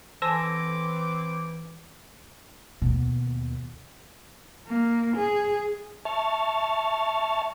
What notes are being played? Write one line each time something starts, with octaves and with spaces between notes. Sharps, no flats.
E3 C4 A4 C5 G#5 D6 E6 A#6
D#2 B2
A#3
G#4
E5 A5 C#6 F6 A6